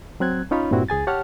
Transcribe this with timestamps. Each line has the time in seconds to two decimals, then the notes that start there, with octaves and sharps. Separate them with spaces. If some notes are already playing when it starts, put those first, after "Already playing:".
0.20 F#3 C4 F#6 G#6
0.51 C#4 D#4 F4 C#5 B5
0.71 G2 A#2 G3 C4 E4 F#4
0.89 C#2 G#4 G#5 A6
1.07 G4 C#5 F#5 A5 F6